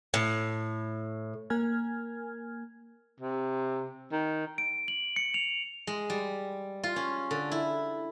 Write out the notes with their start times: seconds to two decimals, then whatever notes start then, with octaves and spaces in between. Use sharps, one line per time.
0.14 A2
1.50 A#3 A#4 G#5 F6 G#6
3.20 C3
4.12 D#3
4.58 D7
4.88 F#7
5.16 C#7
5.34 F7
5.87 G#3
6.10 G3
6.84 F4
6.96 C#4
7.31 D3
7.52 E4